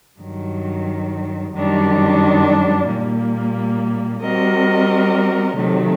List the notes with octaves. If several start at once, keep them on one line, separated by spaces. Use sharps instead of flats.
G2 D#3 F#3
F#2 D#3 G3 D4
A#2 G3 A#3
G3 C4 F#4 A#4 D#5
C3 D#3 F#3 A3